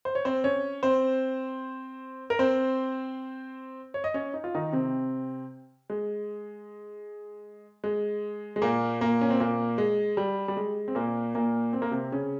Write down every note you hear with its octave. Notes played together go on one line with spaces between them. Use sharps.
C5
C#5
C4 C5
C#4 C#5
C4 C5
A#4
C4 C5
C#5
D#5
C#4 C#5
D#4
F4
D#3 D#4
C3 C4
G#3
G#3
G#3
A#2 A#3
A#2 A#3
C#4
C4
A#2 A#3
G#3
G3
G3
G#3
C4
A#2 A#3
A#2 A#3
C4
A#3
C3 C4
C#3 C#4